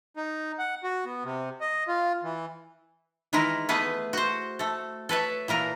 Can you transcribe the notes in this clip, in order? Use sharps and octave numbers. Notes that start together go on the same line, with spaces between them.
D#4
F#5
F#4
B3
C3
D#5
F4
E3
D#3 E3 G#3 E4 A#4
A3 B3 G#4 B4
F#4 C5
A3 A4
A4 B4 C#5 E5
A#2 E3 A#4 A#5